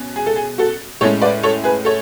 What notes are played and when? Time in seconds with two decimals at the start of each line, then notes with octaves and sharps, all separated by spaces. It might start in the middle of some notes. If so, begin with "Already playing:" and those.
Already playing: B2 C#4
0.16 G#4
0.26 A4
0.36 G#4
0.58 F#4 A4
1.01 A2 G#3 C#4 A4 C#5
1.22 B4 D5
1.43 A4 C#5
1.64 G#4 B4
1.85 A4 C#5